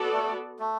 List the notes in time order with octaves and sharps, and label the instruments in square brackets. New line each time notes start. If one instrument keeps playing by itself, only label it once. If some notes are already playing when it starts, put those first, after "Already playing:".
Already playing: [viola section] B3 F#4 A4 D5
[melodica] A3
A3